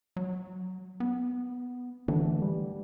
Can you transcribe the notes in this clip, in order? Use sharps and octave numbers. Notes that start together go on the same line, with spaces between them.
F#3
B3
D3 E3 A3
G3